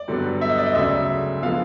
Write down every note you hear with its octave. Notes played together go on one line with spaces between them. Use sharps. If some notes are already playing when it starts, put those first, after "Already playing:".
Already playing: D5
G2 D3 F#3 B3
E5
D#5
D5
D#5
D2 C#3 F#3 E5
D3 F3 G#3 B3 F5